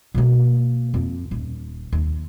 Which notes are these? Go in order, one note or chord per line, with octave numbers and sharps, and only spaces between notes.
B2 A#3
F2
D#1
D#2